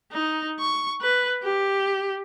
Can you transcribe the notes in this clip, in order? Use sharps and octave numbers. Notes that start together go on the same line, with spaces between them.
D#4
C#6
B4
G4